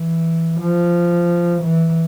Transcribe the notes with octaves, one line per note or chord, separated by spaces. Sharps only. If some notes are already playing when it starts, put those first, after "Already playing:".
Already playing: E3
F3
E3